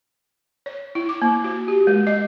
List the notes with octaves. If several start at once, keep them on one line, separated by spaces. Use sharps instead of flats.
C#5
E4
D6
A#3
F#4
G4
G#3
D#5